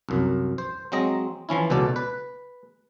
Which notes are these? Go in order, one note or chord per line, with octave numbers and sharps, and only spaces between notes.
C2 F#2
C5
F#3 G#3 C4 D#5 A#5
E3 F3 C#4 E4
C#2 B2 F#3 A4 D5
B4